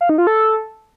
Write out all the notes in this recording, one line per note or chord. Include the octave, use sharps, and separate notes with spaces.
F5
D#4
F4
A4